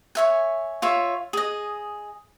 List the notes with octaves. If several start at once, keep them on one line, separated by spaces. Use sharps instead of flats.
C#5 E5 G#5
F4 C#5 E5
G#4 D#5